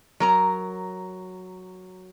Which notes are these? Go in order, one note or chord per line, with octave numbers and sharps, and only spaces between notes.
F#3 A#4 A#5